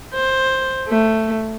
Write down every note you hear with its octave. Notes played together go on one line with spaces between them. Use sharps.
C5
A3